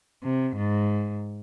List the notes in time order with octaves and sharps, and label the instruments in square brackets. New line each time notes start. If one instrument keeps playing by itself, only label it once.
[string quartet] C3
G#2